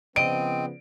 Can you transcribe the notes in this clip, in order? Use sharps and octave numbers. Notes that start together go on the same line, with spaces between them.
C#3 F3 B3 C4 D#5 D7